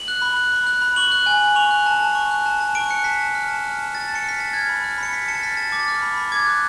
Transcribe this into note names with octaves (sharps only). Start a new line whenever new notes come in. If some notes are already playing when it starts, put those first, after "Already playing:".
Already playing: F#7
F#6
B5
F#6
B5
F#6
B5
C#6 F#7
F#6
G#5
G#5
C#6 F7
F#6
A5
A5
C#6
F#6
A5
A5
C#6 D7
F#6 C#7
A5 B6
A5
F6
A5
F6
A5
F6 A6
A5
C#7
F6 B6
A5 A6
F6 G#6
B5
F6
B5
C#7
F6 B6
A5 C#7
A6
F6 B6
A5 A6
D6 A6
F6
B5
B5
D6 G#6
F#6